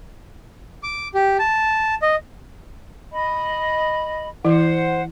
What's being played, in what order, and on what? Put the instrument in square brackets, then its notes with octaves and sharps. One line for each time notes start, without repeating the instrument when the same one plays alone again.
[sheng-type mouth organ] D6
G4
A5
D#5
[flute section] D#5 B5
[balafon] E3 E4 [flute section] C5 F#5